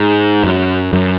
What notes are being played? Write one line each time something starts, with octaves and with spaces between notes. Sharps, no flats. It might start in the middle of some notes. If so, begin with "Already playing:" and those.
Already playing: G#2
F#2
F#2